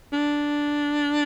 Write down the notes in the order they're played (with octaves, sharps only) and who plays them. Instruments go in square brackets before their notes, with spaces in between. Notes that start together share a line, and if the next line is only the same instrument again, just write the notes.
[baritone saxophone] D4